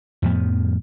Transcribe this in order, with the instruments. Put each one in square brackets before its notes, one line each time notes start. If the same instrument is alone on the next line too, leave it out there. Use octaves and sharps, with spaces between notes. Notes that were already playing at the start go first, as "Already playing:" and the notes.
[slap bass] F2 A2 F3 B3